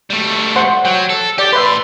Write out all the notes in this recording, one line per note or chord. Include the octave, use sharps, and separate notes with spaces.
G3 A3
C5 F#5 C6
F#3 G5
A4
G4 D5 G5
A2 B4 E5 C6